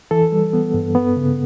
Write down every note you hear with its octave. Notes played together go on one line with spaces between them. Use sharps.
E3 A4
G3
B3
G2
B3
C#3